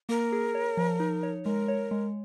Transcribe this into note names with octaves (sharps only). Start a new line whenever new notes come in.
A#3 A#4
G#4
C#5
F3
D#4
C#5
G#3 A#4
C#5
G#3